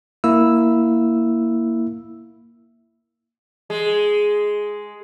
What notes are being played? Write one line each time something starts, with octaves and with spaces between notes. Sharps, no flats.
A#3 E4 E6
G#3